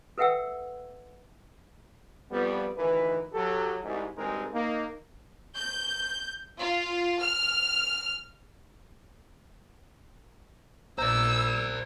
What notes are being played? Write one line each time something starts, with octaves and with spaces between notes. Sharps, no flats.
A4 B4 E5 F#5 G5 E6
F2 G3 B3
D2 D#3 E3 A#4 B4
F#3 G4 A4
C2 G#2
G#1 G2 G#3 C4 D#4 A#4
A#3 D#4
G6
F4
F6
A#1 C5 D5 A#5 E6